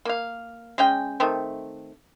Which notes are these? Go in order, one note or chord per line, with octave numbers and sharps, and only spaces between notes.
A#3 F5
G#3 C#4 G5
D#3 A3 C4